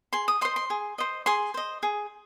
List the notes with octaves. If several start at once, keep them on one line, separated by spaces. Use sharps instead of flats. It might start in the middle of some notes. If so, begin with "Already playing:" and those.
G#4 C6
D#6
C5 D#5 C6
C6
G#4
C5 D#5
G#4 C6
C5 D#5
G#4